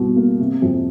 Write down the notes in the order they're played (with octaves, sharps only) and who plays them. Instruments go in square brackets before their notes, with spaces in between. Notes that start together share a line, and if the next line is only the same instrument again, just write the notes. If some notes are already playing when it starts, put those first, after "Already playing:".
Already playing: [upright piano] C2 B2
A#3
C3
F2